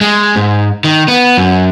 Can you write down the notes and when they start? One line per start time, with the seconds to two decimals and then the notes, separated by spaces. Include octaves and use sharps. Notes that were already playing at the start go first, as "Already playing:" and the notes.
0.01 G#3
0.36 G#2
0.85 D#3
1.08 B3
1.38 F#2